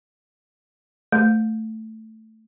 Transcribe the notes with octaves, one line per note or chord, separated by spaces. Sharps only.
A3